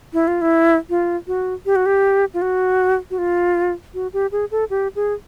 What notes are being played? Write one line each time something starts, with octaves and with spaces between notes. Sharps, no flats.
E4
F4
E4
F4
F#4
G4
F#4
G4
F4
F#4
F#4
F4
F#4
G4
G#4
A4
G4
G#4